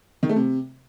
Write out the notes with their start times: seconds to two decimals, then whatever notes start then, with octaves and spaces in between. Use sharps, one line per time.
0.23 D#3
0.29 A3
0.36 C3